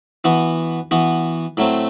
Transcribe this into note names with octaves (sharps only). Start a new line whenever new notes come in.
E3 B3 F#4
E3 B3 F#4
A2 F#3 A3 C4